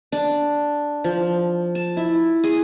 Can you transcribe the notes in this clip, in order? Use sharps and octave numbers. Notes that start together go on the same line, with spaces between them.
D4
F3
A5
E4
G#4